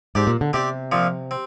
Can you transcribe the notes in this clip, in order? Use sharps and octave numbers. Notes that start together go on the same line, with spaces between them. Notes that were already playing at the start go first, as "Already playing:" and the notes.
G#2 C4 G4 D5
A#2
D3
C3 C4 G4 D5
A#2 F3 C4
C4